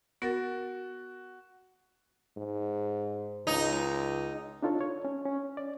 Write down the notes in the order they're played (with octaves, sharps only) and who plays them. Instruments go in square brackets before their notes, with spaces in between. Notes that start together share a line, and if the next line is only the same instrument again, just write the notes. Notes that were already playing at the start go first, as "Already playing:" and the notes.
[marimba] B3 A#4 A6 [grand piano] F#4
[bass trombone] G#2
[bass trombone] C#2 [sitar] D#4
[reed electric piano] D4 D#4 F4 A4 C#5
C#5
C#4
C#4
D5